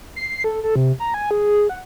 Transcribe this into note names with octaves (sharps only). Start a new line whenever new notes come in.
C7
A4
A4
C3
A#5
G#5
G#4
F#5